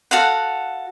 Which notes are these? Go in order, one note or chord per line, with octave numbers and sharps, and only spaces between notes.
F#4 A4 F5 F#5